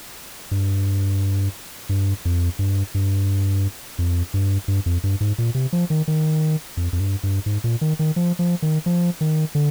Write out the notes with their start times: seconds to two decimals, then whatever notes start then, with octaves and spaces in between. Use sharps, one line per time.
0.51 G2
1.89 G2
2.25 F2
2.59 G2
2.94 G2
3.98 F2
4.34 G2
4.68 G2
4.86 F2
5.04 G2
5.21 G#2
5.38 A#2
5.55 C3
5.73 F3
5.90 D#3
6.08 D#3
6.77 F2
6.93 F2
7.00 G2
7.23 G2
7.46 G#2
7.64 A#2
7.81 D#3
7.99 D#3
8.16 F3
8.39 F3
8.62 D#3
8.86 F3
9.21 D#3
9.55 D3